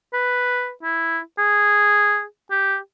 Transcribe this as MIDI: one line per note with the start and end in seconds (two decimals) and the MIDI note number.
0.13 0.71 71
0.83 1.19 64
1.38 2.23 68
2.51 2.77 67